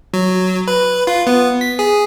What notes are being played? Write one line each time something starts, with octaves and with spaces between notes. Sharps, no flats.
F#3
B4
F4
B3
B6
G#4